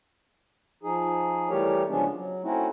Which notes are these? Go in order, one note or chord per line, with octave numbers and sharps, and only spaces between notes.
F3 D#4 G#4
E3 G3 A3 G4 A#4 C#5
C#3 F3 G#3 B3 C#4 D4
F#3
A3 C4 C#4 D#4 E4 F#4